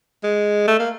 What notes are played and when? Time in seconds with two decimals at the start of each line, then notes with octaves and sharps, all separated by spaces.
0.23 G#3
0.68 A3
0.79 A#3